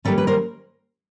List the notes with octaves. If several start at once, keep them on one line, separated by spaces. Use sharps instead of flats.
D#3 G3 A#3 C#4 A4 B4
B4
A#4 C5